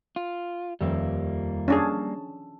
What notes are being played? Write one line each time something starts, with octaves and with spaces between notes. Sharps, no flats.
F4
D#1 F2 G3 A#3 E5
C#4 D4 G#4 A5 E6